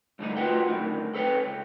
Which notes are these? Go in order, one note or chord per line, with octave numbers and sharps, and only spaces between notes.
G2 D3 A3 D#4
F4 F#4 A#4 B4 F#5 G5
F#2 A2 D3 D#3
A4 B4 C#5 G5
C#2